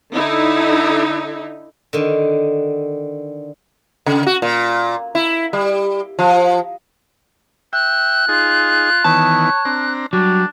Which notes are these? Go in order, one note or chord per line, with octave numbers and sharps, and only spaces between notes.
D3 D#4 E4
D3 D#3
C#3
F#4
A#2
E4
G3
F3
E5 G5 F#6
D#4 F4 G#4
D#3 E3 B3 C#5 A5
C4 D4 A#5
F#3 G3 D4